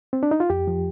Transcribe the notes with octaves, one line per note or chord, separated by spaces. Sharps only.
C4
D4
D#4
F4
F2 G4
F3